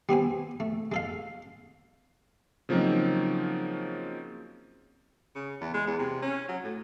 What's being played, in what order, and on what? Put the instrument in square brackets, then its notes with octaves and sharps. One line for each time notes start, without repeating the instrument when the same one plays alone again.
[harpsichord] G3 B3 C4 G#5
A3
G#3 A4 F5
[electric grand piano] C#3 F3 F#3 A#3 C4 D#4
[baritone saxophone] C#3
E2
G#3
E2
C3
C#4
F#3
A2